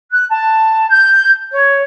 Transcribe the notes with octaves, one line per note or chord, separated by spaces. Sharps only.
F#6
A5
G6
C#5